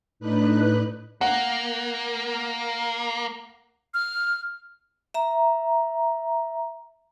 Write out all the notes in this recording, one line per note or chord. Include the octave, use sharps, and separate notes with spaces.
A2 D4 D#4 B4 F#6
A#3 F#5
F6
E5 A#5